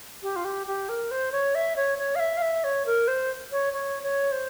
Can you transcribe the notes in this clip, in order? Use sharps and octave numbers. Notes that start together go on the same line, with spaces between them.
G4
F4
G4
G4
A#4
C5
C#5
E5
C#5
C#5
F5
E5
F5
E5
C#5
A#4
C5
C#5
C#5
C#5
C5